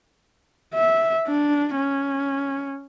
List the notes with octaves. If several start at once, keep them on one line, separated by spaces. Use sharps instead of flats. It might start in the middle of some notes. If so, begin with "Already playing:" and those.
E5
D4
C#4